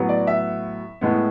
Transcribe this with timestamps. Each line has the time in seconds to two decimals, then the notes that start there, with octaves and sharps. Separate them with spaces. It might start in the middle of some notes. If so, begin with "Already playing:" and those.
Already playing: A2 F#3 B3
0.09 D5
0.27 E5
1.01 A2 G#3 B3